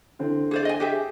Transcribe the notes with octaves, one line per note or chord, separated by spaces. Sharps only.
D3 E3 C4
G#4 C5 D5
D#5 G#5
G4 G#4 E5